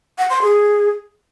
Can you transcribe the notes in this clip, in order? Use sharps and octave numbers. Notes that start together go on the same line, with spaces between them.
F#5
C6
G#4